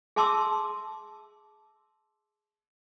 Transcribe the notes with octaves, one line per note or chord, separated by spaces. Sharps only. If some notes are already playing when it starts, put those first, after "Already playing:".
G#4 E5 A5 C6 D6 E6